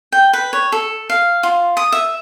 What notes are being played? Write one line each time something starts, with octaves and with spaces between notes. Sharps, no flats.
G5
B4
C#5
A4
F5
F4
D#6
E5